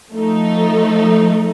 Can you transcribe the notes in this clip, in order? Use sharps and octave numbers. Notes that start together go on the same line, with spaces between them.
F3 A3 D#4